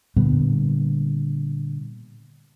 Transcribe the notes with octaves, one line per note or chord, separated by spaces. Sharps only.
A#2 D3 G3 B3